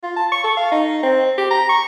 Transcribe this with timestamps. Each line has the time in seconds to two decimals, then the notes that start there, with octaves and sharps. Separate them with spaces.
0.04 F4
0.16 A5
0.32 C#6
0.44 A4
0.57 F5
0.72 D#4
1.03 C4
1.38 G4
1.51 A#5
1.70 C#6